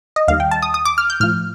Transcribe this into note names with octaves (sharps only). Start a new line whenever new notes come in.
D#5
D#2 D#3 G3 F5
G5
A5
D#6
D#6
D6
F6
G6
A2 F3 F6